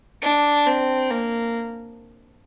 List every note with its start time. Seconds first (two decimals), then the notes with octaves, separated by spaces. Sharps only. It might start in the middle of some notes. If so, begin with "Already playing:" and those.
0.23 D4
0.67 C4
1.10 A#3